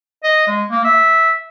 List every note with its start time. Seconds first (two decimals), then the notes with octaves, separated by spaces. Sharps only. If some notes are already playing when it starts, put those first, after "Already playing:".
0.24 D#5
0.48 G#3
0.71 A#3
0.84 E5